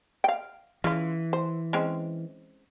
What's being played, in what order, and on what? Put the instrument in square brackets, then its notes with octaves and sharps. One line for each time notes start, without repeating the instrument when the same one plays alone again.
[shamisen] F5 G5
[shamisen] C#3 F4 [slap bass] E3
[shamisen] C5
G#3 C4 C#4